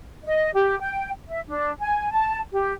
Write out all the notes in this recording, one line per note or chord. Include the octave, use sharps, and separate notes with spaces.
D#5
G4
G5
E5
D4
G#5
A5
G4